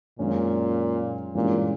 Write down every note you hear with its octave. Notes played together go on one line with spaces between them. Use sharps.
F#2 A#2 D#3 G#3 C#4
G2 A#2 E3 G#3 C#4